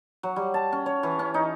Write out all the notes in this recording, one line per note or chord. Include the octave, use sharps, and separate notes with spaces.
F#3
G3
A5
C#4
C#5
E3
C#4
D#4